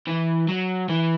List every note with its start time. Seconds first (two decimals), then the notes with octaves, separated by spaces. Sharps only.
0.07 E3
0.48 F#3
0.89 E3